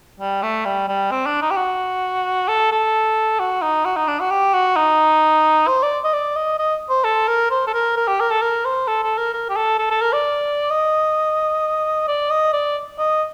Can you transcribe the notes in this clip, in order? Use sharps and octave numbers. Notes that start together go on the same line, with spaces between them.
G3
A3
G3
G3
C4
D4
D#4
G4
F#4
A4
A4
F#4
D#4
F#4
D#4
D4
F#4
G4
F#4
D#4
C5
D5
D#5
D5
D#5
D#5
C5
A4
A#4
C5
A4
A#4
A#4
G4
A#4
A4
A#4
C5
A4
A4
A#4
A#4
G4
A4
A4
A4
A#4
D5
D#5
D5
D#5
D5
D#5